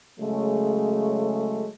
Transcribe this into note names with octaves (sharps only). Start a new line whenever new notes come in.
C#3 F#3 G#3 A3